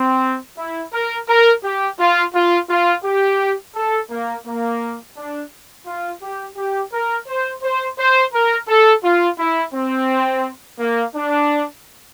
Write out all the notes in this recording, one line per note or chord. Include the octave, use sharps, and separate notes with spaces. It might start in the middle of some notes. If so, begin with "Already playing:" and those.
Already playing: C4
E4
A#4
A#4
G4
F4
F4
F4
G4
A4
A#3
A#3
D4
F4
G4
G4
A#4
C5
C5
C5
A#4
A4
F4
E4
C4
A#3
D4